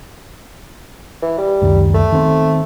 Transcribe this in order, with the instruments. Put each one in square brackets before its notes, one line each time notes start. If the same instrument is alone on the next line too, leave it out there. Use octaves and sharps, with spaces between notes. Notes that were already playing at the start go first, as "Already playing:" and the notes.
[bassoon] E3
G3
[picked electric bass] C#2 F#2 D#3
[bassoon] A3
[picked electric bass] D#3 B3 C4